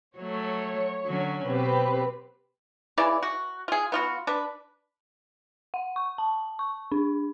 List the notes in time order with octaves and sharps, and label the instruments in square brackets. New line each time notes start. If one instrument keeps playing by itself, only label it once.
[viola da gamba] F#3 A3 [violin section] C#5
[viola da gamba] D3 F#3 C#4
[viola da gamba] B2 [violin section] C4 G4 B4
[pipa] C#3 E3 E4 D5
F#4
F4 G#4
B3 F4 F#4
D4 B4
[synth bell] F#5
C#6
A5
C#6
D4